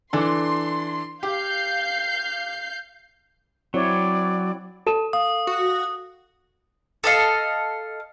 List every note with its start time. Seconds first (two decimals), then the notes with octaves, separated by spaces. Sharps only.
0.13 E3 D4 A4 C6
1.23 G4 F5 G6 C7
3.74 F#3 C4 E4 C#5 D5
4.87 A4 A5 E7
5.13 F5 D#6
5.47 F#4
7.04 A4 D#5 F5